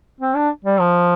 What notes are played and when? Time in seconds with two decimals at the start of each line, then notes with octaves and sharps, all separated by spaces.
0.20 C4
0.36 D4
0.64 G3
0.80 F3